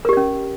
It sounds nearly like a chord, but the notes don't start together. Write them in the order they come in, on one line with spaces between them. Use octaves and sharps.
A#4 G4 D5 C#4